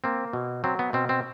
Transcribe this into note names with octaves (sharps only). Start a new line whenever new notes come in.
A#3 C4
B2
F#3 C4
B3
B2 C4
C4